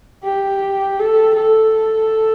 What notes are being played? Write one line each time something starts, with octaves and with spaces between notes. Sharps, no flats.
G4
A4
A4